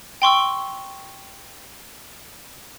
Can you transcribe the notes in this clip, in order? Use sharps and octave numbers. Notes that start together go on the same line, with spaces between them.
G5 C6 C#6 E6